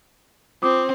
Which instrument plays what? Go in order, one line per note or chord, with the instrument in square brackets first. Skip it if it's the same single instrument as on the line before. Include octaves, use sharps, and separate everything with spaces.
[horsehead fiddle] C4 [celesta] F4 D6 D#6